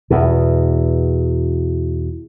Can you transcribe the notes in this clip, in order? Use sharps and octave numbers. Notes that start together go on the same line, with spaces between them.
E2 B2